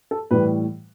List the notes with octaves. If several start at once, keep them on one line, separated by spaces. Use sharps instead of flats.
A4
A2 E3 G3 B4